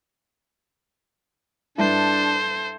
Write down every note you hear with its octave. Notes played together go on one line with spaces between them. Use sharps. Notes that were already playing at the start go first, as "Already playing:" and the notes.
G2 D4 E4 A4 C5